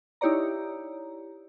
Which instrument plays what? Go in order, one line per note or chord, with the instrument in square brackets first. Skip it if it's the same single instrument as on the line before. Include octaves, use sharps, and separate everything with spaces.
[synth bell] D#4 E4 G4 C#5 D5 A#5